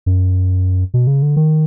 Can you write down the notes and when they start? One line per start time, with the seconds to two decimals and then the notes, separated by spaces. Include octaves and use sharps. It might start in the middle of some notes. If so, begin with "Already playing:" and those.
0.06 F#2
0.94 B2
1.07 C#3
1.22 D3
1.36 D#3